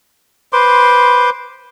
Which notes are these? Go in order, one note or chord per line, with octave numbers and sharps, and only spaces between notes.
B4 C5 C6 D6